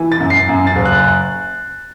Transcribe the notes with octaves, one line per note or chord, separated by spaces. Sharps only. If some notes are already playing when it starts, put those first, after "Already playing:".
Already playing: E3
A6
F#2
C7
F#2
A6
F#1
F#6